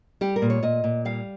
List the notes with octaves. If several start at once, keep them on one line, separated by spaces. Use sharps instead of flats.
G3 G4
A#4
A#2
C#5
A#2 D#5
A#2
G3 F5